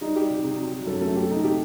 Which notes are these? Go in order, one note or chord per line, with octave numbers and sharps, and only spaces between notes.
G3 D#4
G3 G4
C3
C3
F#3
F#3
F#2 A4
A3 A4
A3 G4
C3 D#4
A3 G4